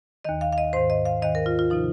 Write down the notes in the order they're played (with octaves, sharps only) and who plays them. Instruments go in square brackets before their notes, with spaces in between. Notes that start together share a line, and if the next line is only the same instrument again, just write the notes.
[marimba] D#2 D#3 D#5
F5
F5
D#5
G#2 D#3 C5
D#5
F5
D#2 D#3 D#5
A#4
F4
F4
C3 F3 D#4